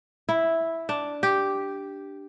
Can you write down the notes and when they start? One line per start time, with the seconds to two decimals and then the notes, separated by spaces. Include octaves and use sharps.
0.29 E4
0.89 D4
1.23 G4